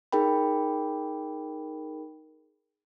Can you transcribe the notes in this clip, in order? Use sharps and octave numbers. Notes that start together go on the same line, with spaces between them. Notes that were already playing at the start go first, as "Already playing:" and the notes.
D#4 G#4 A#4 G5 B5